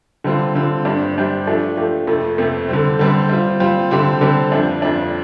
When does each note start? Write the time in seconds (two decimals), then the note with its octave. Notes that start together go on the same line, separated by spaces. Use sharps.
0.24 D3 G3 C4 F4
0.55 D3 G3 C4 F4
0.85 G2 G3 D4 G4 C5
1.16 G2 G3 D4 G4 C5
1.47 F3 A3 D4 G4
1.77 F3 A3 D4 G4
2.07 F2 C3 A3
2.38 F2 C3 A3
2.69 D3 G3 C4
2.99 D3 G3 C4
3.29 G3 C4 F4
3.60 G3 C4 F4
3.91 D3 G3 C4 G4 C5
4.21 D3 G3 C4 G4 C5
4.52 F2 F3 D4
4.82 F2 F3 D4